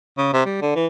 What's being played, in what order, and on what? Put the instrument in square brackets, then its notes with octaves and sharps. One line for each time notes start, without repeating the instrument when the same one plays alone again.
[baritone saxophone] C#3
C3
G3
D3
E3